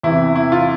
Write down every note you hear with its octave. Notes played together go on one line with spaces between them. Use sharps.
E2 C3 E3 E4
E4
F4